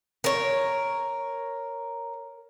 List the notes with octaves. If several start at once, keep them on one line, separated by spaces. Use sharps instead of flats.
A#4 C#5